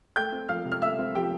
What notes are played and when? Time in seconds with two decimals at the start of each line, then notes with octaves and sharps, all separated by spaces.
0.16 A3 G5 G6
0.32 C4
0.49 F3 F5 F6
0.65 C3
0.72 F6
0.82 A3 E5 E6
0.99 C4
1.15 F3 G4 G5